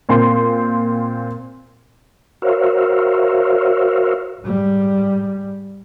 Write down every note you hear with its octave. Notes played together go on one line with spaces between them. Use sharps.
A#2 C4 C6
F#4 A#4 C5 C#5 E5 F5
G#2 G3